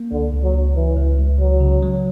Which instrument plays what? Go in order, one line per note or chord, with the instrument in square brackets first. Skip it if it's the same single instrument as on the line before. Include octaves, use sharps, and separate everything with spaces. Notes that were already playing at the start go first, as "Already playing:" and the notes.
Already playing: [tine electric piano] A#3
[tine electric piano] C#2 [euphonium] D3
[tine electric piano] C#2
[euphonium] F#3
[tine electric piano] C#2
[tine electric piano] C#2 [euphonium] E3
[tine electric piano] C#2
C#2
[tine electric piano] C#2 [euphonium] F#3
[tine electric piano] C#3
F#3